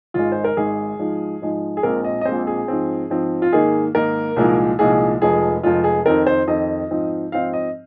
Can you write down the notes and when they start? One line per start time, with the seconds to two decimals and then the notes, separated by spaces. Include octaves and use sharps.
0.14 G#1 G#2 G#3 F4
0.32 C5
0.44 A#4
0.57 G#1 G#2 G#3 G#4
0.99 G#2 F3 G#3 D#4
1.42 G#2 F3 G#3 D#4
1.77 G#4
1.83 A#1 A#2 G#3 C4 A#4
2.04 D#5
2.21 D#5
2.25 A#1 A#2 G#3 C4 C5
2.47 G#4
2.68 G#2 F3 C4
3.10 G#2 F3 C4
3.42 F4
3.53 G#2 D#3 A#3 D#4 G#4
3.95 G#2 D#3 A#3 D#4 A#4
4.36 C2 A#2 F3 G#3 D#4
4.79 C2 A#2 F3 G#3 D#4 G#4
5.21 F1 F2 F3 G#3 G#4
5.63 F1 F2 F3 G#3 F4
5.84 G#4
6.06 F2 D#3 C4 D#4 A#4
6.27 C5
6.48 F2 D#3 C4 D#4 D#5
6.90 G#2 F3 C4 D#4
7.32 G#2 F3 C4 D#4 F5
7.53 D#5